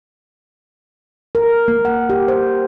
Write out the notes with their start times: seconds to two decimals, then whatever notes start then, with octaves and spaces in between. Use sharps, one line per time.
1.35 A#4
1.68 A#3
1.85 F#5
2.10 G4
2.28 C5